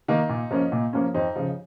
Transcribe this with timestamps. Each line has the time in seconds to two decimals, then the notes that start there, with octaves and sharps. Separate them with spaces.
0.08 D#3 A#3 D#4
0.29 A#2
0.51 F3 A#3 C#4
0.72 A#2
0.93 F3 A#3 C#4
1.14 F2 D#4
1.36 C#3 F3